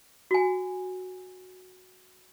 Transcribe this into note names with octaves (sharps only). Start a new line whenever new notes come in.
F#4 G#5